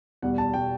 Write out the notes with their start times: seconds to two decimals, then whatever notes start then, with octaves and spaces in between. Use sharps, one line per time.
0.22 E2 B2 G3 F#5
0.38 A5
0.54 B2 G3 G5